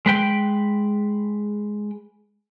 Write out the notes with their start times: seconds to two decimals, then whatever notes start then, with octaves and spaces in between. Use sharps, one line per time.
0.06 G#3 B4 G5